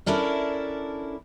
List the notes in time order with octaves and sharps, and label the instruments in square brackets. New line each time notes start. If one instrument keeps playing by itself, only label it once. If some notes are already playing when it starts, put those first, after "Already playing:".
[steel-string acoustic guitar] C#4 D4 E4 A4 A#4 D5